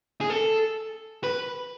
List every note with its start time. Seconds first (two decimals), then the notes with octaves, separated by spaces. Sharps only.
0.21 G#4
0.30 A4
1.24 B4